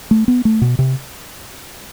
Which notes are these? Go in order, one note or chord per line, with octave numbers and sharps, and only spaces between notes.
A3
B3
A3
B2
C3